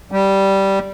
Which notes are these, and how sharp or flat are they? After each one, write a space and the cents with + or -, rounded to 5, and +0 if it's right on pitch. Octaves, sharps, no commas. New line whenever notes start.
G3 -10